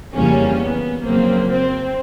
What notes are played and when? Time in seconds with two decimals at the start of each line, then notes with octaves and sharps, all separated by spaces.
0.15 F2 C#3 E3 G3 A#3 C#4
0.61 B3
1.05 F2 C#3 F#3 A#3 C4
1.51 C4